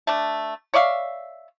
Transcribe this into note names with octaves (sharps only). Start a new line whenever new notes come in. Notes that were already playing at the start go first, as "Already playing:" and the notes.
A3 D4
C#5 D5 E5 F5